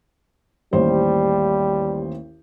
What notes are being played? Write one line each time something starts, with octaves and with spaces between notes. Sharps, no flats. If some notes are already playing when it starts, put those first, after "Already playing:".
A1 D#2 G3 C5